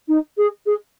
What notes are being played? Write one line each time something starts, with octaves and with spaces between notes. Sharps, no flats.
D#4
G#4
G#4